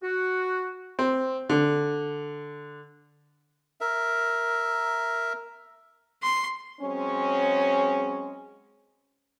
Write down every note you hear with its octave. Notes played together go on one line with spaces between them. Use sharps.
F#4
C4
D3
A#4 E5
C6
F#3 G#3 C4 C#4